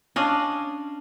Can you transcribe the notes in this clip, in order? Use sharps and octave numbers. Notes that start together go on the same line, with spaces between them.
C#4 D4 D#5 F5